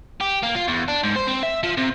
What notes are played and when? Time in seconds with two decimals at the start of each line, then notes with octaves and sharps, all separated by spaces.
0.21 G4
0.43 A#3
0.56 F4
0.68 E2
0.88 D4
1.03 G#2
1.16 C5
1.27 C4
1.43 E5
1.64 F3
1.78 C3